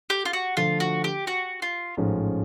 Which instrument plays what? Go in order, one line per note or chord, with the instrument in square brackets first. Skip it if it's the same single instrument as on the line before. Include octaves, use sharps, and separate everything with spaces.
[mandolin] G4
F4
F#4
[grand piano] D3 F3 A3 [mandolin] F4
[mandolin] F#4
G4
F#4
F4
[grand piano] A1 G#2 F3 A3 C#4